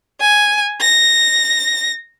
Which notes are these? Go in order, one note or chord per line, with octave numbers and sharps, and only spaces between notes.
G#5
A#6